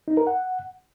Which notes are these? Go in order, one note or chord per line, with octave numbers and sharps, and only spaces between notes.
D#4
A#4
F#5